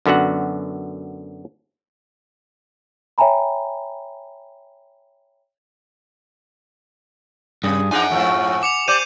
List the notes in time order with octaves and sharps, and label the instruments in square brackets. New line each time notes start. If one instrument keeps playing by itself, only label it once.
[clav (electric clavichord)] F#2 D3 B3 F#4 F#5
[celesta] C#5 E5 G5 G#5 A#5 B5
[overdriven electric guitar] G2 [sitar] C3 [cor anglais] G#4
[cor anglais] F3 [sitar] D4 D#4 G#4 [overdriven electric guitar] F#5 G#5
[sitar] G#2 F3 A3 [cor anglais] C#4
[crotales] D6 C#7 F7
[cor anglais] G4 [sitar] C5 D5 [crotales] D6 G6 D#7